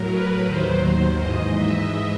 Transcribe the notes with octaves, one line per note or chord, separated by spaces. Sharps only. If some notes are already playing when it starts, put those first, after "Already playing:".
Already playing: A2 F#3 A#4
B4
D#2 D#3 F#3 C5
G#2 E3 D#5
E5